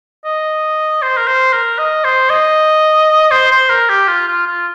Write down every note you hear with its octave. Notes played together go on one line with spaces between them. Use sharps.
D#5
C5
A#4
C5
A#4
D#5
C5
D#5
C5
C5
A#4
G4
F4
F4
F4